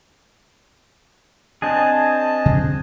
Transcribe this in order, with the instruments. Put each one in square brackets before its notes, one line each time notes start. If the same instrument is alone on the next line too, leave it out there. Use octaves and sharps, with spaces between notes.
[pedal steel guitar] C4 D4 G#4 [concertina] D#5 A5
[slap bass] C#3 E3 F3